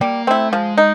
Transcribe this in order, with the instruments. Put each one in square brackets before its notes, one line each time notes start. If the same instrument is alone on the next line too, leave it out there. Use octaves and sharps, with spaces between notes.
[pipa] G3 [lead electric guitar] A#3
[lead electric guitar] A3 [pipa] C4 E4
[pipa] F3 [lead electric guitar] G#3
[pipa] D#4